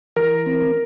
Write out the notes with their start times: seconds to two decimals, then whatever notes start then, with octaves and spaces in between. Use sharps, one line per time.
0.16 E3 A#4
0.46 C4